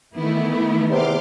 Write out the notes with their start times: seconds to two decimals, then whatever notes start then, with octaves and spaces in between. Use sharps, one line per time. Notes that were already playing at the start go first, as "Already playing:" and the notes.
0.16 D#3 E3 A3 B3 E4
0.90 E2 C3 C6 D6 F6